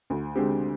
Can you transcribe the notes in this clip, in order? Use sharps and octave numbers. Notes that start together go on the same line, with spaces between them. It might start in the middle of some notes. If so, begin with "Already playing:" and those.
D2
D3 G#3 C4 G4